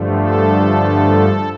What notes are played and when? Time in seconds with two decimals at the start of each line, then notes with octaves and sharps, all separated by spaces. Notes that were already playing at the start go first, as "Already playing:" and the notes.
Already playing: G2 D3 F3 A3
0.17 A4